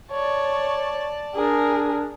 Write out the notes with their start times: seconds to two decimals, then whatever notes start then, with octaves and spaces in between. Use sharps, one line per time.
0.11 C#5 D5 A5
1.35 D4 G#4 A#4